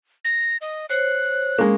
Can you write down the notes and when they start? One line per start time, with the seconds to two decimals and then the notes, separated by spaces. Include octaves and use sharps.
0.24 A#6
0.61 D#5
0.90 C5 C#5 F#6
1.58 G#3 A#3 C#4